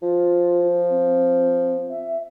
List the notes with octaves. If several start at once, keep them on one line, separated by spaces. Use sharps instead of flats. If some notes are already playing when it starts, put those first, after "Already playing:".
F3 F4
C4
E5